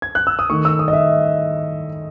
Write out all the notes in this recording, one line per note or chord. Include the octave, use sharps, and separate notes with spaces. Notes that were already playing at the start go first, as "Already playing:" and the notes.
G#6
F#6
E6
D#6
D#3 A3 C#6
E6
D#6
D#5
E5